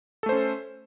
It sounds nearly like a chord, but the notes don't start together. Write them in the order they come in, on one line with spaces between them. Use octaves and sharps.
A4 A3 C5 C#4